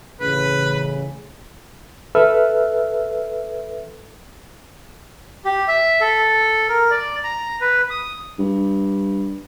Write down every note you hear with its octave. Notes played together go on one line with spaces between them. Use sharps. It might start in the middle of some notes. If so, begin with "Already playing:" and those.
A1 C#3 B4
A4 B4 E5 E6 F6
G4
E5
A4
A#4
D5
A#5
B4
D#6
G2